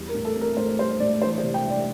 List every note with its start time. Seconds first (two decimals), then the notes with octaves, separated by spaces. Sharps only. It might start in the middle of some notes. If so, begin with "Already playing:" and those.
Already playing: E2 G3
0.08 A#4
0.15 A2
0.25 A4
0.36 C4
0.41 A#4
0.57 A2 C5
0.79 G3 C5
1.00 A2 D5
1.22 E3 C5
1.38 C5
1.43 C3
1.54 G5
1.65 G3 D5